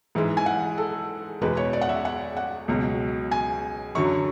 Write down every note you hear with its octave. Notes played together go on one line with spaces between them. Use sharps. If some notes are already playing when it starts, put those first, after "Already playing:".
G#2 E3 G#3
G#5
F#5
A4
E2 B2 G#3 B4
C#5
D5
F#5
E5
F#5
F#5
C#2 B2 F#3
G#5
F#2 D3 F#3 C#6